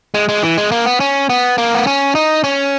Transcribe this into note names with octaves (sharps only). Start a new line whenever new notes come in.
G#3
G#3
E3
G#3
A#3
B3
C#4
B3
A#3
B3
C#4
D#4
C#4